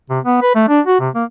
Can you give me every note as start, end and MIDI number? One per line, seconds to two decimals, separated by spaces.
0.10 0.19 48
0.24 0.41 59
0.42 0.52 71
0.55 0.64 57
0.69 0.80 62
0.87 0.99 66
1.00 1.09 48
1.15 1.24 58